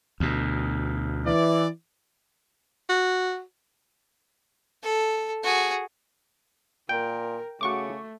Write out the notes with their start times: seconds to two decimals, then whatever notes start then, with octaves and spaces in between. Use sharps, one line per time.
0.20 D2 B2
1.25 E3 D5
2.89 F#4
4.83 A4
5.43 F#4 G#4
6.89 A#2 A#4 G5
7.61 C#3 A3 F#4 C#6 D6